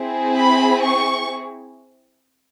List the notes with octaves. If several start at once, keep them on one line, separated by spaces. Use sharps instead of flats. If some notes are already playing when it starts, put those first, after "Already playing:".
Already playing: C4 E4 G#4
B5
C#6